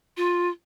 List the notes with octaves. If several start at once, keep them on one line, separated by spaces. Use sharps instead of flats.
F4